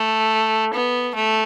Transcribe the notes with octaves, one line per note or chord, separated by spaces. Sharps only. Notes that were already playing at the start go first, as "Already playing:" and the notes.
Already playing: A3
B3
A3